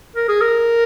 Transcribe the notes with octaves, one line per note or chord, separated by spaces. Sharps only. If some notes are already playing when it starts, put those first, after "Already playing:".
A#4
G#4
A#4